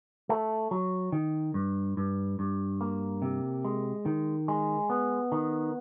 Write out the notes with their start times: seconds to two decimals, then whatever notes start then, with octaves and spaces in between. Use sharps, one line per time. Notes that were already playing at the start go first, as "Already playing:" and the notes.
0.29 A3
0.71 F#3
1.12 D#3
1.54 G2
1.97 G2
2.39 G2
2.81 A#3
3.22 C3
3.65 G#3
4.06 D#3
4.48 G#3
4.90 B3
5.32 D#3